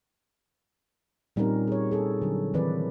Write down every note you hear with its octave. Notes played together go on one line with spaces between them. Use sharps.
A#2 G3 C4 C#4 D#4 A#4
G#4 C#5
G#4 A4
D3 F#3
D#3 E3 C4 B4 D5